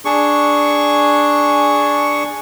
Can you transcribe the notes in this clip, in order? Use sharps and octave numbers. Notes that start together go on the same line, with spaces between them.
D4 G#4 C#6